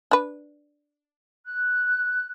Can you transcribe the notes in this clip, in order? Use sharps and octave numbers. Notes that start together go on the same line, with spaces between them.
D4 B4
F#6